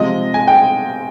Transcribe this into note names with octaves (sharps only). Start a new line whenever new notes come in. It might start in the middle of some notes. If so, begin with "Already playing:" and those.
Already playing: C3 F3 G#3 D#5
G#5
G5